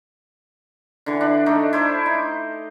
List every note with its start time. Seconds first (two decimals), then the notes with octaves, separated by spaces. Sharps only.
1.06 D3 E3
1.21 D4
1.46 A3 D4 D#4
1.73 E4 C5 A5
2.06 D#4